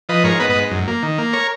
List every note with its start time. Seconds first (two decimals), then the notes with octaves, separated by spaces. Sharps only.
0.09 F3 B4 D#5
0.24 G#2 A#4 C#5
0.40 B3 B4 D#5
0.50 B4 D#5
0.55 G#2
0.71 F#2
0.87 A#3
1.03 D#3
1.18 A#3
1.33 A#4 C#5